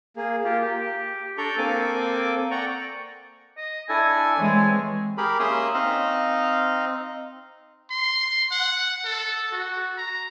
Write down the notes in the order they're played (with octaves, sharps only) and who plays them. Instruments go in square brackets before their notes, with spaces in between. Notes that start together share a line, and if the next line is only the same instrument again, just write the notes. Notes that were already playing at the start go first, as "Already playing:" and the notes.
[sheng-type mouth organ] A#3 G#4
A#3 F4 G4
G4
D4 A4 D5 A#5 C#6 G6
A#3 C4 A4 G#5 D6
D5 F#5 G5 A#5 C#6
[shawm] D#5
[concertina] D4 E4 A4 [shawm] G#5
[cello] E3 G#3 [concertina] C4 C#5
[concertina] G4 G#4 A#4 B5
A#3 C#4 E5 C6 D#6 E6
C4 D#4 D#5 F5
[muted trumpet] C6
F#5
A4
F#4
A#5